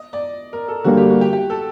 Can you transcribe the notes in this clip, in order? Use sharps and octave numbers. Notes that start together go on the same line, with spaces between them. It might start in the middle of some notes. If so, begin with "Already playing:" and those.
Already playing: D#5
D5
A#4
A4
D3 G3 A#3 F#4
G4
F#4
G4
G4
A4